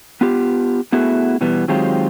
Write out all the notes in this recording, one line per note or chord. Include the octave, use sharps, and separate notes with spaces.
B3 F4 G4
A3 B3 E4 F#4 G#4
B2 E3 G3 B3
D#3 F#3 G#3 C4 F4 G4